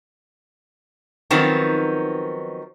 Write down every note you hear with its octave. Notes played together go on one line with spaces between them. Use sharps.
D#3 F3 F#3 B3 C4 D#4